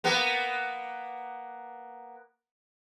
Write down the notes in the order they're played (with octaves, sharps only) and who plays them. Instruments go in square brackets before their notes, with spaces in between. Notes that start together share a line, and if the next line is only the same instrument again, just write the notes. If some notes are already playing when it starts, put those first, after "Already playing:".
[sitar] A#3 B3 A#4